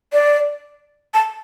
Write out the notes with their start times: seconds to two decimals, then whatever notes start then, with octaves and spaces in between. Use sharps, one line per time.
0.13 D5
1.14 A5